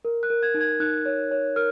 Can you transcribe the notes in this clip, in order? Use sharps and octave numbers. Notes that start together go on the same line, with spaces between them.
A#4
F#6
A#4
G#6
D#4
G#6
D#4 F#6
C#5
C#5
A#4 F6